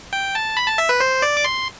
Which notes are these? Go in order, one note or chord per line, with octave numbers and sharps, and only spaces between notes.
G5
A5
B5
A5
E5
B4
C5
D5
D6
C6